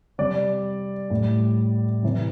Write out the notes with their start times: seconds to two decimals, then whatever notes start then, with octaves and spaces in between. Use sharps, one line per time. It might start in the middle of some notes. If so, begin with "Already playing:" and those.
0.18 C3 G3 D5
1.10 A2 G3
2.03 C3 E3 G3